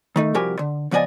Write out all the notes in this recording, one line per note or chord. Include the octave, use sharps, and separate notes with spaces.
D#3 A3 D#4
C2 F3 F#4 G4 A#4 G#5
D3
C#2 F3 B3 D5 D#5 G#5